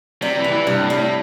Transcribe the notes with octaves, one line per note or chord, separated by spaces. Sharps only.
C3 G3
E3
C3
E3
G2 C3
A2
G3
A2